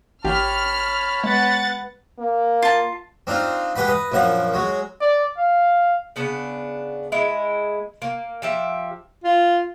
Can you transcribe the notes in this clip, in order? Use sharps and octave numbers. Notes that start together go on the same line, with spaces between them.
G#1 G4 C#5 A5 B5 F6
G#3 B3 F#5 A6
A#3
F4 A5
C4 D4 D#4 F4
G#3 G4 B4 F#5 B5
B4 D#5
A#1 F#2 F3 F#5
F#3 G#3
D5
F5
C#3 B3 D4
G#3 E4
A#3
F3 G4 E5
F4